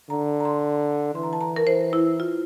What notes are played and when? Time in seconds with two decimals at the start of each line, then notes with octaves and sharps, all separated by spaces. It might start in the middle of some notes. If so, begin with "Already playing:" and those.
0.10 D3 A#5
0.40 A#5
0.45 C6
1.15 E3 C6
1.23 A#5
1.33 A5
1.41 A#5
1.56 A#4
1.67 E3 C5
1.93 E4
2.20 F4